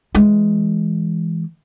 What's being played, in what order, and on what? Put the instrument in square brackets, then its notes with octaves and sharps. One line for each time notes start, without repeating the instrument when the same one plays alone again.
[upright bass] E3 G#3